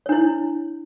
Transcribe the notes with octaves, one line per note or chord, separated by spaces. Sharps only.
D4 E4 C#5